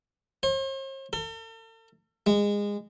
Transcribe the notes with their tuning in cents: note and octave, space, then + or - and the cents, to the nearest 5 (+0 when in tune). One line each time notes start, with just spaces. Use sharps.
C5 +45
A4 +45
G#3 -20